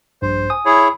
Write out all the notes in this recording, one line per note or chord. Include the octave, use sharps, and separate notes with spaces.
A#1 G2 C5
G#5 D#6
E4 G#4 C#5